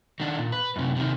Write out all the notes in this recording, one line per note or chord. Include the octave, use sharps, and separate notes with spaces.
D#3 D4
A#2
B4
F#2 C3
C3 D#3